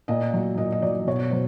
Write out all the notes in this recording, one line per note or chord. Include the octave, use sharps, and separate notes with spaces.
A#2 D#5
F#3
A#2 D#5
D#5
F#3 D5
B2 C#5
F#3 C5